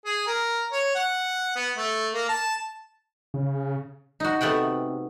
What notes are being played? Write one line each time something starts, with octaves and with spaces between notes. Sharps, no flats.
G#4
A#4
C#5
F#5
B3
A3
A#3
A5
C#3
D#4 F#4
C3 A3 B3 F#5 G5